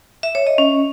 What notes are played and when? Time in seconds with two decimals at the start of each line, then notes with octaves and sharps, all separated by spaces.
0.23 E5
0.35 C#5
0.47 D#5
0.58 C#4